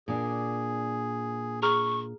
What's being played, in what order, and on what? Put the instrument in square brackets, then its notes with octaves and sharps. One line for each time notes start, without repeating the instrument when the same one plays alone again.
[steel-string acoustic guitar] A#2 D4 [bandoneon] G#4
[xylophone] G#4 A#5 F6 [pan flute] C#6